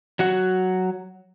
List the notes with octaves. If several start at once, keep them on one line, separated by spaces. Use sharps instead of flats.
F#3 F#4 F#5